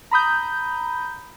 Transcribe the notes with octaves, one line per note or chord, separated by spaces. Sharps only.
A#5 B5 D#6 G6